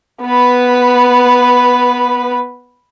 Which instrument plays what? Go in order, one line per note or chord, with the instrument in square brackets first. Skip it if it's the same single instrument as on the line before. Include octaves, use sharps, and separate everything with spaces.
[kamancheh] B3 B4